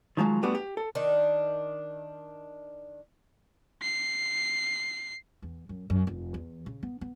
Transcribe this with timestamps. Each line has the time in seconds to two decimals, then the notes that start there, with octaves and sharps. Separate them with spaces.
0.17 D#3 F3 F#3 G#3
0.43 G3 A3 B3 D4 F#4 G4
0.55 G4
0.77 A4
0.95 D#3 D4
3.82 C7
5.42 E2
5.69 F#2
5.90 F#2
6.07 F1
6.34 E2
6.66 C#3
6.83 B3
7.01 B3